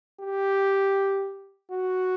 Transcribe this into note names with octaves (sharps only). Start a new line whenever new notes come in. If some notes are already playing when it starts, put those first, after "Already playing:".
G4
F#4